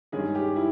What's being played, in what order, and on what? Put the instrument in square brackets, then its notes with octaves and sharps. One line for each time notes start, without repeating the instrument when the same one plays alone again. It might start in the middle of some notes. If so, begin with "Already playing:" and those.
[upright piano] G2 D#3 G#3 C#4 G#4
G4
E4